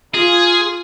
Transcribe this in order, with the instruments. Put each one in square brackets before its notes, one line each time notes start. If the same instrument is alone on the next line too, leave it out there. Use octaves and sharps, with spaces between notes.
[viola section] F4 [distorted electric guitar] G#4